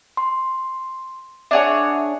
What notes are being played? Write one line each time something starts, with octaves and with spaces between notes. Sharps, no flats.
C6
D4 G#4 C#5 E5 F#5